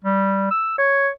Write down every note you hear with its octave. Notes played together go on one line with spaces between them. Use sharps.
G3
E6
C#5